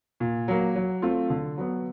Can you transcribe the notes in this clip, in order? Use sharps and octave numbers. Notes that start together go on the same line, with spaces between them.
A#2
F#3 A#3
F#3
A3 C4 F4
D3
F#3 B3